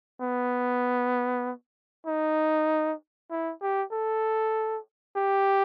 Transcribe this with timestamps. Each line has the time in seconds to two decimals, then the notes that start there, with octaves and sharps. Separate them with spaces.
0.21 B3
2.07 D#4
3.31 E4
3.61 G4
3.92 A4
5.16 G4